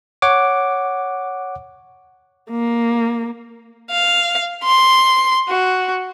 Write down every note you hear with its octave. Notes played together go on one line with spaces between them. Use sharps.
C#5 F#5 D6
A#3
F5
C6
F#4